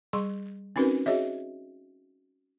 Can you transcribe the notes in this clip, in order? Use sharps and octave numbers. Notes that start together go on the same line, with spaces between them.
G3 G#4 C6 C#6
C4 C#4 D#4 F#4 A#4 B4
F#4 G#4 C#5 D#5 E5